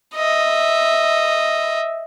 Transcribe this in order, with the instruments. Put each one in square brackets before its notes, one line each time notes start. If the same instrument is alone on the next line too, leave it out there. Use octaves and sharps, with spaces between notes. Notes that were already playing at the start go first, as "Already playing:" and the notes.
[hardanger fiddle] D#5 E5